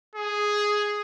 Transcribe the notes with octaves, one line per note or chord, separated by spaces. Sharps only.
G#4